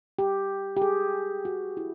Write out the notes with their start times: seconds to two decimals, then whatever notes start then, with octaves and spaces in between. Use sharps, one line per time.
0.19 G4
0.77 G4
0.82 G#4
1.45 F#4
1.77 E4